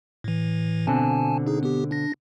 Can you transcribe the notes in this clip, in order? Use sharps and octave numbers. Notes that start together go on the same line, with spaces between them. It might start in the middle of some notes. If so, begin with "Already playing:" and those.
A2 E3
B2 D3 C4 G#5 A5
D#4 G#4
B3 G4
D4 A#6